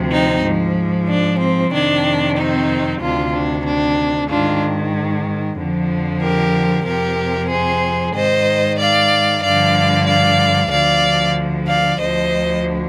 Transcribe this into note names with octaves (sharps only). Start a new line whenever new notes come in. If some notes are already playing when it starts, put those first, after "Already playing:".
Already playing: D2 C3 F3
C4 D#4
G#2 F3
D4
C4
F2 C3 D#3 D4
C4 D#4
D2 C3 D#3 D4 F4
D4
D4
G#2 D#3 D4 F4
F2 D3 F3
G4 A#4
F2 C3 F3 G4 A#4
G#4 C5
G#2 D#3 C5 D#5
D5 F5
G2 D3 F3 D5 F5
D5 F5
D2 D3 F3 D5 F5
D5 F5
D2 D3 F3 C5 D#5